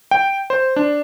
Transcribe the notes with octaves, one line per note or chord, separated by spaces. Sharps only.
G5
C5
D4